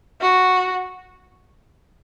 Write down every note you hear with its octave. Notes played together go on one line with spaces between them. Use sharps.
F#4